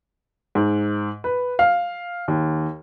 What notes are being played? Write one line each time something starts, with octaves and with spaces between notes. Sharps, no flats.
G#2
B4
F5
D#2